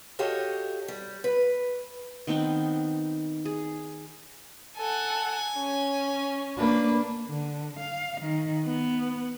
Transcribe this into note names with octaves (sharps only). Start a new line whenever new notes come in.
F#4 G4 A4 C#5 D#5 F5
G3
B4
D#3 B3 C4 D#4
G#4
A4 F#5 G#5
C#4
A#3 D4 B4
D3
F5
D#3
B3